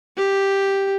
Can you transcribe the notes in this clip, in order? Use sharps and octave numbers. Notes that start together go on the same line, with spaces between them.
G4